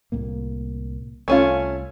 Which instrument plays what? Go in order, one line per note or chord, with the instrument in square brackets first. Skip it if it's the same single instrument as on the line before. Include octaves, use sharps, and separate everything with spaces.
[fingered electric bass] C2 A2 A#3
[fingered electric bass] C2 [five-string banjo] A3 C#4 F4